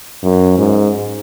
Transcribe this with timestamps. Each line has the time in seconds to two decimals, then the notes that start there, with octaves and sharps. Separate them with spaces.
0.23 F#2
0.58 G#2